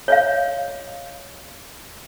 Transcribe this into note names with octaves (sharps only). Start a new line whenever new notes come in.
C#5 D#5 F5